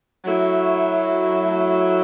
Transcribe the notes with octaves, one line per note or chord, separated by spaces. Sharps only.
F#3 A3 E4